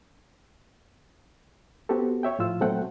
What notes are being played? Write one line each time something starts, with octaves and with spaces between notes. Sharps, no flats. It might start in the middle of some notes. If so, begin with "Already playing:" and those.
B3 C4 F#4 G4 A4
C#5 E5 G5
A2 F3 F4 E6
A#2 F#3 A3 C4 F#5 G5